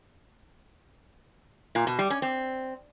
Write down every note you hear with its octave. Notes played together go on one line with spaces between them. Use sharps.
A#2
B2
G3
C#4
C4